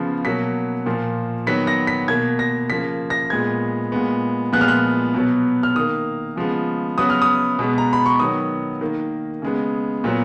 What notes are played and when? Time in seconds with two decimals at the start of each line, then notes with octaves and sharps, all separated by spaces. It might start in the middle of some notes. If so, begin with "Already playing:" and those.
Already playing: C#3 F3 B3
0.25 B2 F#3 A#3 B6
0.86 A#2 F3 A#3
1.47 D#3 F#3 B3 B6
1.67 A#6
1.87 B6
2.08 B2 A#3 G#6
2.39 A#6
2.70 C#3 F3 A#3 B6
3.10 A#6
3.30 A#2 G#3 B3 G#6
3.92 A#2 G#3 B3
4.53 A#2 F3 G#3 B3 F#6
4.61 F6
4.68 F#6
5.14 B2 F#3 B3
5.63 F6
5.75 D#3 A#3 D#6
6.36 C#3 F3 G#3 B3
6.98 C#3 F#3 B3 D#6
7.10 F6
7.22 D#6
7.59 B2 G#3 B3
7.78 A#5
7.93 B5
8.06 C#6
8.20 D#3 F#3 B3 D#6
8.81 D#3 A#3
9.42 C#3 G#3 B3
10.04 A#2 F#3 B3